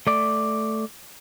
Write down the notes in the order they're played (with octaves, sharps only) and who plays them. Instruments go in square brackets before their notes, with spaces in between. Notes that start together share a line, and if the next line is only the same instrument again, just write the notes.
[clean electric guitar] A3 D5